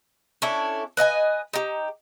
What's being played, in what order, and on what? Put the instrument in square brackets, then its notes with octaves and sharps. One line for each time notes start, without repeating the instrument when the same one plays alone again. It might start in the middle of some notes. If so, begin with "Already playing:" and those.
[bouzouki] C#4 D4 E4 A4
B4 D#5 F#5 G#5
D#4 G4